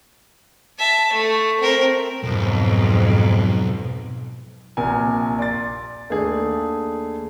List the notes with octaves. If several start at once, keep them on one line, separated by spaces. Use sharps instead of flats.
E5 A5
A3
C4 A#4
B1 F2 G#2
A#1 C3 A#4 G#5
D5 C6 A6
D#2 A3 D4 G#4